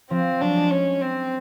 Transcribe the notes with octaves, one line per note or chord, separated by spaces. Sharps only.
F3 C4
F#3 D4
G#3
C#4
C4